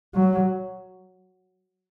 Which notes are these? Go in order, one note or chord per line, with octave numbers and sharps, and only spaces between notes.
F#3